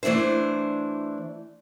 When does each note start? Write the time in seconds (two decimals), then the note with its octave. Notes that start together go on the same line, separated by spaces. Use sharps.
0.03 E3 A3 D4 E4 C5